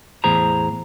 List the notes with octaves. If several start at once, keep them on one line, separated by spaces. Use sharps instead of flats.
E2 A2 G#4 C5 A#5